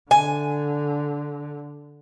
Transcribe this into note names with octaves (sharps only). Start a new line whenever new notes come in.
D3 G#5